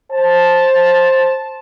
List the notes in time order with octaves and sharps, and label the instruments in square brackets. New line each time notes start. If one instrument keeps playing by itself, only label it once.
[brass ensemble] C5 A5